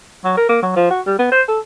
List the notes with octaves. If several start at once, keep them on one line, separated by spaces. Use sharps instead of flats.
F#3
A#4
A#3
F#3
F3
F#4
G3
B3
C5
A4